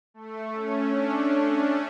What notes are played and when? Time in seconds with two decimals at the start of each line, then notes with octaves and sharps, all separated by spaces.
0.14 A3
0.52 C#4
0.88 D4